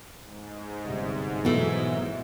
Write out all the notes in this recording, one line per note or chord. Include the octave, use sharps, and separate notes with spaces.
G#2
G1 C3
B2 E3 F#3 G#3 A3